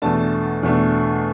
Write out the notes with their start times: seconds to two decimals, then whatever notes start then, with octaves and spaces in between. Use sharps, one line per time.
0.02 E2 B2 A3 D4 A5
0.63 E2 B2 A3 D4